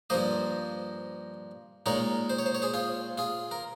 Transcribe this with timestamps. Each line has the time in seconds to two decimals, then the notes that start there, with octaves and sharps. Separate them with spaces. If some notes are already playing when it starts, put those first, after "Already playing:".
0.10 G2 F3 A#3 C5 D#5
1.86 A#2 G#3 D#4 A#4 C#5
2.30 C5
2.39 C#5
2.46 C5
2.55 C#5
2.62 G#4 C5
2.74 F4 G#4
3.18 F4 G#4
3.51 A#4